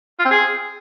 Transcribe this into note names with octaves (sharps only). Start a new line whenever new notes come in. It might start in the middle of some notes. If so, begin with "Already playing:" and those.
F4
C4
G#4